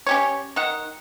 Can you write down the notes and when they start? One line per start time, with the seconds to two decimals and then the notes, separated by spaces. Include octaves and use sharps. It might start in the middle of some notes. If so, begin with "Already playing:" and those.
0.07 C#4 G4 C#5
0.56 D#3 F#5